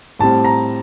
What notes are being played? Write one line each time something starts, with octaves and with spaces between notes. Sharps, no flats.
A2 G3 C4 A5
A#5